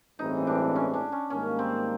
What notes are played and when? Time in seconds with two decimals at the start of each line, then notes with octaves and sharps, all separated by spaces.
0.19 A1 G2 E3 G#3 C4 D#4
0.47 D4
0.75 C#4
0.94 D4
1.12 C#4
1.30 G#2 D#3 G3 A#3 C#4
1.59 C4